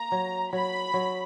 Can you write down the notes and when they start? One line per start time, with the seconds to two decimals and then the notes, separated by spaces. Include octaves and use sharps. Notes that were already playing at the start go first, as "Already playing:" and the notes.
Already playing: A#3 A#5
0.12 F#3
0.53 F#3 B5
0.94 F#3